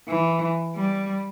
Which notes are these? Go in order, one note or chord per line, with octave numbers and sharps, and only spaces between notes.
E3
G3